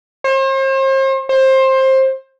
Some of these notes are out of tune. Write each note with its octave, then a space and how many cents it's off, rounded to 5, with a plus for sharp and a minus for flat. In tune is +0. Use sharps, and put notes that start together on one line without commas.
C5 +40
C5 +20